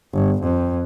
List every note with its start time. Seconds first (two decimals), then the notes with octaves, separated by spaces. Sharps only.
0.13 G1
0.43 F2